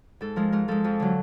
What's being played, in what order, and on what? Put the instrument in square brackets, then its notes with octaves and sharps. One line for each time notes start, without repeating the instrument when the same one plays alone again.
[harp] G#2 A4
F3 G#3 A#4
G#2 A#4
F3 G#3 A4
F2
D3 F#3